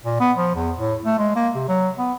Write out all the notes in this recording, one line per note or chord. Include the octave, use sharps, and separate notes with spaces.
A#2
B3
F3
E2
A2
A3
G#3
A#3
C3
F#3
B3